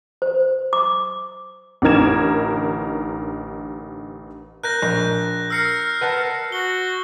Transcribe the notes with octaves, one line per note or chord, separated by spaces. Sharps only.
C5
D6
A1 D3 D#4 A#4 G#6 E7
A#4 F#6 G6 A#6
A#1
A#4 E6 C7 C#7
B4 F#5 A5
F#4 G7